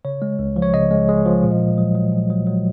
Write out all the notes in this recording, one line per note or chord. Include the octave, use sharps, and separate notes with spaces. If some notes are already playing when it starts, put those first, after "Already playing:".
C#3 C#5
G#3
C#2
F3
C#5
C#3 D#5
G#3
G#3
F3
A#2
A#2
F#3
F#3
A#2
F#3
F#3